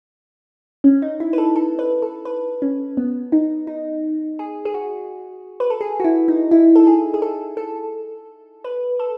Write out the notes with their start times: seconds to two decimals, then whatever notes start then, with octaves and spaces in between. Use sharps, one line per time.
0.84 C#4
1.02 D#4
1.20 E4
1.33 B4
1.38 A4
1.56 A4
1.79 B4
2.02 A4
2.25 B4
2.62 C#4
2.97 B3
3.32 D#4
3.67 D#4
4.39 G#4
4.65 G#4
4.74 F#4
5.60 B4
5.70 A4
5.81 G#4
6.00 F#4
6.04 E4
6.28 D#4
6.51 E4
6.76 A4
6.87 G#4
7.14 G#4
7.22 A4
7.57 A4
8.64 B4
9.00 A4